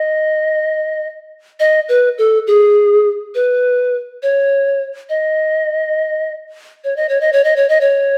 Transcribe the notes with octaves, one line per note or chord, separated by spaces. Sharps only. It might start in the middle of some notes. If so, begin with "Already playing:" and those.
Already playing: D#5
D#5
B4
A4
G#4
B4
C#5
D#5
C#5
D#5
C#5
D#5
C#5
D#5
C#5
D#5
C#5